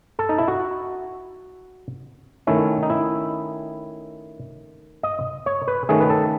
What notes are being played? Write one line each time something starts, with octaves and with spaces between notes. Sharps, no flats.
A4
D#4
E4
F#4
D#3 A3 C#4 E4
D#4
E4
D#5
C#5
B4
D#3 A3 C#4 G#4
B4
A4